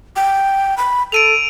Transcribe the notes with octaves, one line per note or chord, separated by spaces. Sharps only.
G5
B5
A4 D7 D#7 F7